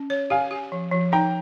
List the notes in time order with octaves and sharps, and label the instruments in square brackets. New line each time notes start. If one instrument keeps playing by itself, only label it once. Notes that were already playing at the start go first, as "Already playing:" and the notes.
Already playing: [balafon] C#4
C#5
[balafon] G4 [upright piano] F5 G#5
[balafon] G4
F3
F3
[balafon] D#4 [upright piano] G5 A#5